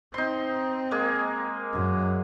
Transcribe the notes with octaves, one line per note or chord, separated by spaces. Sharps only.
C4 D#4 C6
G#3 A#3 G#4
F#2